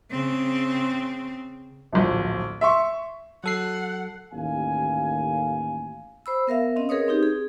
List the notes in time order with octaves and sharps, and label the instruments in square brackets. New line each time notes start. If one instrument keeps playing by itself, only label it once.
[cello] C#3 C4
[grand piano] D1 A#1
E5 C6 C#6
[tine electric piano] F#3 A4 C7 [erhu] F#5
[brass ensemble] A1 D#2 F5 G#5
[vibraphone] C5 B5 E6
B3 A#4 E5 F5
C4 C#4 D#5
G#4 A#4 B4 C#5 D#6
C4 D#4 G4
G#4